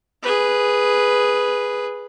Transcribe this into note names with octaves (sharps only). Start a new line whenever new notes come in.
G#4 B4